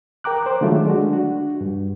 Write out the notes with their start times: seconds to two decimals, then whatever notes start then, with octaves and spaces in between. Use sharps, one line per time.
0.24 A#4 G5 A#5 D6 F#6
0.43 C5 D6
0.61 D3 D#3 F#3 G#3 A3 F4
0.86 G#3 D4 F#4
1.10 D4 F#4
1.61 G2